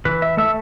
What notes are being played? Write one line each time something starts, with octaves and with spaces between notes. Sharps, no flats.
E3 B4
E5
A3 E5